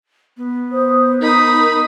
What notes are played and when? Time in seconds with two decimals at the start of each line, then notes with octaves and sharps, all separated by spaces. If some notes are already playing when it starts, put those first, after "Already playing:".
0.37 B3
0.72 C5 D#6
1.21 D#4 A#4 B5 D#6